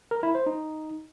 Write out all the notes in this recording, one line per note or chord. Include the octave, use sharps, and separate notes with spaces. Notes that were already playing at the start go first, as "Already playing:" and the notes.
A#4
E4
C5
D#4